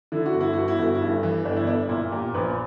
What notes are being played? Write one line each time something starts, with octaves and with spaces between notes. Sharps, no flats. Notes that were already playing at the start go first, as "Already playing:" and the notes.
D3 E4
F#4
G1
E4
G1 F#4
E4
G1 F#4
E4
G2
E3
G1 D4
E4
G1 D4
A#2 E4
A#2 G4
A#1 B4